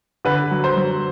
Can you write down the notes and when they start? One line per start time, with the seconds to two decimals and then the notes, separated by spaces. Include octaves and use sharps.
0.25 D3 B4
0.51 F#3
0.64 C5
0.77 F#3